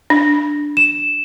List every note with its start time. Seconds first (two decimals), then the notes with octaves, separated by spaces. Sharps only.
0.10 D4
0.77 E7